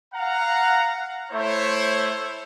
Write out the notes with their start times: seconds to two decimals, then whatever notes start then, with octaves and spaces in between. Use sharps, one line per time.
0.14 F5 F#5 A#5
1.31 A3 E4 C5 C#5